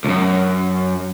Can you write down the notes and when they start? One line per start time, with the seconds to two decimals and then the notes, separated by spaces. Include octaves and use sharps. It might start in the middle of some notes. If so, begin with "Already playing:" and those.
0.04 C#2 F#2